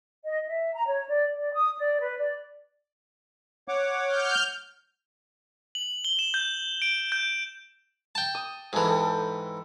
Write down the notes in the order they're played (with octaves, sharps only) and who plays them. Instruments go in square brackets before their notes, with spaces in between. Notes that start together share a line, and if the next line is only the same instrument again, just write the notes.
[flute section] D#5
E5
A#5
C#5
D5
D5
D#6
D5
B4
D5
[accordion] C#5 F#5 D6
[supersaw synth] F6 G6
[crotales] F#7
G7
E7
G6
D7
G6
[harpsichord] G5 A5
[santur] D#6
[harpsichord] G#2 E3 [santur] G#4 A4 B4
[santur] A4 G5